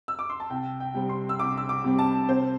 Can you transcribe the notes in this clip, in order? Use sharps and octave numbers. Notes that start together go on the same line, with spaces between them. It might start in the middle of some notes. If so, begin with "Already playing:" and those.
E6
D6
C6
A5
C2 G5
G5
C3 G3 C4
C6
E6
C2 D6
E6
D6
C3 G3 C4
A5
C3 C5